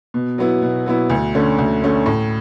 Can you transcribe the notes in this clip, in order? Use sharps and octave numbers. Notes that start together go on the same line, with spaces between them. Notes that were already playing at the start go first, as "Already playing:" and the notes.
B2
F#3 B3 E4
B2
F#3 B3 E4
D2
D3 A3 C#4
D2
D3 A3 C#4
A2